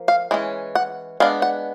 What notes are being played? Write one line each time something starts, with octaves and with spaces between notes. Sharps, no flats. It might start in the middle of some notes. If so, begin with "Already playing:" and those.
Already playing: F3 A#3
F5
E3 G#3 C#4
F#5
G#3 B3 D4 F5
F#5